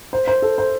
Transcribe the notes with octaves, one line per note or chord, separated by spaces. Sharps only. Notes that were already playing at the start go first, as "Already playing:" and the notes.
C5
C5
A4
C5